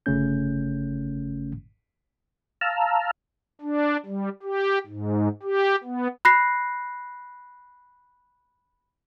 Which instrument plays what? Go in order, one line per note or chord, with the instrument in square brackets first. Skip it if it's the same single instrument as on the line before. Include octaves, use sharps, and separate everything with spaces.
[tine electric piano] G1 C#3 A3 C#4 G6
[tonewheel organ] F5 A5 A#5 E6 F6
[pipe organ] D4
G3
G4
G#2
G4
B3
[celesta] B5 F#6 A#6 C7